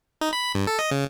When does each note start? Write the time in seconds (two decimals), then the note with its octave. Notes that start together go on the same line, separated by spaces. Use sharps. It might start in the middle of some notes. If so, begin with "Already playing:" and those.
0.21 D#4
0.33 B5
0.55 G2
0.67 A4
0.79 D#5
0.91 C#3